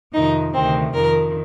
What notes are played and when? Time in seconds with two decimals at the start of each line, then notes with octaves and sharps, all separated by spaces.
0.13 F2 C3 D#3 D#4
0.54 D2 C3 D#3 C4
0.94 F2 D#3 A#4